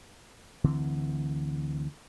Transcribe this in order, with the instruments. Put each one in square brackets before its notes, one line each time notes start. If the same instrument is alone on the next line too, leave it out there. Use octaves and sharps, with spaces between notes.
[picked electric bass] D2 D3 E3 C4